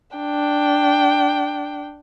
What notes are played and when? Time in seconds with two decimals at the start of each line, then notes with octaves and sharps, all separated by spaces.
0.17 D4 G5